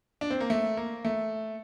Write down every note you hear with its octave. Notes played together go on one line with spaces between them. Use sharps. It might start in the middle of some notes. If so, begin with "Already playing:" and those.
D4
C4
A#3
A3
A#3
A3